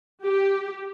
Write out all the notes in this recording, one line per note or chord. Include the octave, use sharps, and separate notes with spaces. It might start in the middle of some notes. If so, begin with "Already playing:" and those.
G4